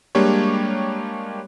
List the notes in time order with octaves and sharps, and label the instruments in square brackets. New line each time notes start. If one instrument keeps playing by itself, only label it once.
[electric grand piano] G3 G#3 A#3 D4 G4 C#5